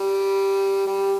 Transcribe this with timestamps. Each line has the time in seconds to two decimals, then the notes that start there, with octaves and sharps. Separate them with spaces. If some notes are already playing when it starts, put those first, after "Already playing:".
Already playing: G3
0.87 G3